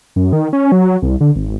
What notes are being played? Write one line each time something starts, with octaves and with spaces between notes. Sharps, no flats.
F#2
D#3
C#4
F#3
C2
D3
G#1